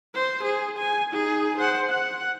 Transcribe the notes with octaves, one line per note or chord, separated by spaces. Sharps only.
C5
G#4
G#5
D#4 G#4
C5 F#5
F#5